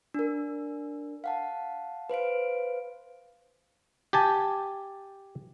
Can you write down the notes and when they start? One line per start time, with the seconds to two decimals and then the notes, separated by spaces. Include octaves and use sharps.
0.14 D4 A#4
1.24 F5 F#5 A5
2.10 B4 C5 F5 D7
4.13 G4 G#5 A5